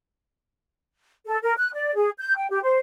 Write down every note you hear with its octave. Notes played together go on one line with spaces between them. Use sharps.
A4
A#4
F#6
D5
G#4
G6
G5
G4
C5